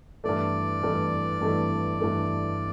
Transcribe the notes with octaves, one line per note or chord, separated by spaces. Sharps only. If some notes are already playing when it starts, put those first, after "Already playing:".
G2 E3 A3 D5
G2 E3 A3
G2 E3 A3
G2 E3 A3